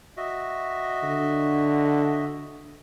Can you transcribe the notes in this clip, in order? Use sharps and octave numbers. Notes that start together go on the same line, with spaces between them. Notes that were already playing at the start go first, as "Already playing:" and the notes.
F#4 D#5 E5
D3